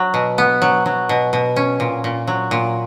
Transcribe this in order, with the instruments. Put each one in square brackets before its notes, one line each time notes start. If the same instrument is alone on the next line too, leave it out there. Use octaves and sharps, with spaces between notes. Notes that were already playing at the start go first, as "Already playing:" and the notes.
Already playing: [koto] F#3
B2
B3
F#3
F#3
B2
B2
C#4
A#2
A#2
F#3
A#2